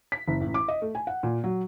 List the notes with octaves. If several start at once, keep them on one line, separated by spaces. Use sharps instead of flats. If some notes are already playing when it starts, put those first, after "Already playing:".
B6
F#1
A1
D6
D#5
A3
G#5
F#5
A#2
F#3